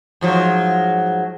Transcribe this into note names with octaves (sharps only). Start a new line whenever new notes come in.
G#2 F3 F#3